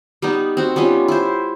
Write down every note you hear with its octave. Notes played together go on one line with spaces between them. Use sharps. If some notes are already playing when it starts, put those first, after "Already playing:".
G3 B3 D#4
C4 F#4
G3 B3 C#4 F4
E4 C5